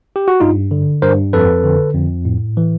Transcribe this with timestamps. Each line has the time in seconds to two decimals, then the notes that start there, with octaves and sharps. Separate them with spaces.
0.16 G4
0.28 F#4
0.40 G2 D#4 F4
0.71 D3
1.02 G2 A#4 C5
1.33 F2 A4 B4
1.64 D3
1.95 F2
2.25 A2
2.57 E3